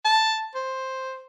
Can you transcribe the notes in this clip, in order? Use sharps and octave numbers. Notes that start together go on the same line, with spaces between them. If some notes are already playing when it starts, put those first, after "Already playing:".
A5
C5